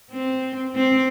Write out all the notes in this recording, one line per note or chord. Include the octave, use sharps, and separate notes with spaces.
C4
C4